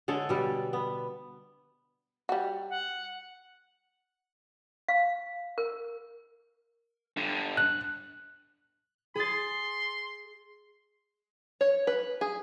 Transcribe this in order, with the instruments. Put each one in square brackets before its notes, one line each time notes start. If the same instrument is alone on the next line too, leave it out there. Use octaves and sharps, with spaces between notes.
[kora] D3 G#3 A4 C#5
B2 G3
B3
[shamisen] G3 F#4
[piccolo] F#5
[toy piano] F5
A#4
[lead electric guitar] G2 D3
[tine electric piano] F#6
[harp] G#4 A6 [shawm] C6
[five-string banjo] C#5
B4
G#4